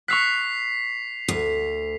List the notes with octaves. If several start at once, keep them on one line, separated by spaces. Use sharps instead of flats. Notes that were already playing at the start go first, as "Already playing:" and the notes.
C#6 E6 F#6 B6 C7 F7
D2